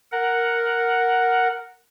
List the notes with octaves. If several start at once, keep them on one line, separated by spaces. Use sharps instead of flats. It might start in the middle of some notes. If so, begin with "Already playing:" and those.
A#4 F#5